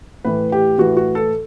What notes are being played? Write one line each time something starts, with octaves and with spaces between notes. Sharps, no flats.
A2 E3 B4
G4
A2 E3 F#4
F#4
A4